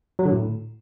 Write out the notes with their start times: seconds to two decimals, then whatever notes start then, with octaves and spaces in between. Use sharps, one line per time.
0.19 F#3
0.25 D3
0.32 A2